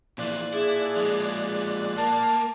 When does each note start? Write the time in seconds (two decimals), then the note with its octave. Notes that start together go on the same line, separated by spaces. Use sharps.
0.18 F2 A#2 E3 D5 F#6
0.54 D4 E4 G#4
0.95 F3 G#3
1.98 A#3 A5